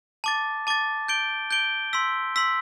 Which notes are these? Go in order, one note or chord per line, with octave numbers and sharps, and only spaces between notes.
A5 D6 A6
A5 D6 A6
G6 D7 G7
G6 D7 G7
C6 E6 B6
C6 E6 B6